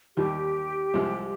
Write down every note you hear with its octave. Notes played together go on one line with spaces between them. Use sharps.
D#2 D#3 G3 G4
C2 C3 F3 G#3